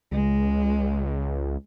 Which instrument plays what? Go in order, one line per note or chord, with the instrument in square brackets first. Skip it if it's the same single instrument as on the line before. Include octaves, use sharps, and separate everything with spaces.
[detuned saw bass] C#2 [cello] G#3